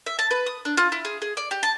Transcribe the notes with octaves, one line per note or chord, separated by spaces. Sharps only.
E5
A5
B4
D#6
D4
F4
E4
G#4
G#4
D5
G4
A5